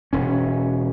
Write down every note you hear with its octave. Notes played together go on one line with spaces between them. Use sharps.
E1 C#4